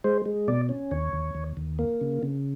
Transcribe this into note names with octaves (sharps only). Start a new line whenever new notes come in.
G#3 C5
G#3
B2 D5
C#4
D#2 C#5
D#2
D#2
D#2
A#3
C#3
C#3